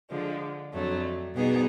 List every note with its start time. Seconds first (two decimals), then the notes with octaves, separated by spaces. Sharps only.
0.10 D3 F3 G#3
0.73 F2 D3 F#3 A3
1.35 B2 G3 B3 D#4 G#4